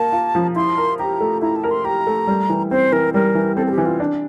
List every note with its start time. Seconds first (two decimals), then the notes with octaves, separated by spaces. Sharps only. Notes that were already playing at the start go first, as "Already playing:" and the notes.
Already playing: A#3 F4 A#4 A5
0.12 F4
0.35 F3
0.56 E4 C6
0.77 A#4
0.99 G4 A#5
1.21 A3
1.42 E4 A#5
1.56 A5
1.63 A#4
1.71 C6
1.84 G4 A#5
2.07 A3
2.27 G3
2.49 E3
2.71 C4 C5
2.92 E3 A#4
3.14 G3 A#4
3.35 E3
3.56 C4 A4
3.67 A4
3.71 G4
3.78 E3
3.85 F4
4.00 D4